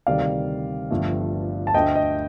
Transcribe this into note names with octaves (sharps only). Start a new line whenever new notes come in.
D2 C3 D#3 G3 D5 F5
G1 G2 F3 A3
A5
D2 D3 A3 D#5 G5
D#5